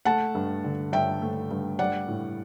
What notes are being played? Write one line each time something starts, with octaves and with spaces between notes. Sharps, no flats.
A3 F#5 A5
G2
D3
G2 E5 G5
A3
G2
G3 D5 F#5
A2